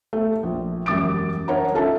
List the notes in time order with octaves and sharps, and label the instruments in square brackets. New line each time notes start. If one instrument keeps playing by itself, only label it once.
[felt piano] A3
A#1
E1 F#2 G3 D6 A6 D7
D4 A#4 C#5 F#5 A#5
C#4 D#4 F4 A4 E5 A5